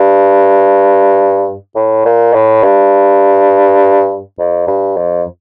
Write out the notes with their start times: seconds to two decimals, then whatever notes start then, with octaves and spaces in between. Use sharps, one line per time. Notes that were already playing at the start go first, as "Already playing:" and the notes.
Already playing: G2
1.75 A2
2.05 A#2
2.33 A2
2.63 G2
4.39 F2
4.67 G2
4.96 F2